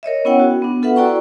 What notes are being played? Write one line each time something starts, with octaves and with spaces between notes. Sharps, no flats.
A#4 C#5 D#5 E5
B3 C#4 E4 C#5 F#5 G5
F#4
B3 D4
F4 A4 B4 E5 F#5
E4 F#4 D5 G5 A#5 C#6